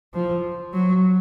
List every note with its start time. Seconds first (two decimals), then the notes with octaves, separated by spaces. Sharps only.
0.14 F3
0.73 F#3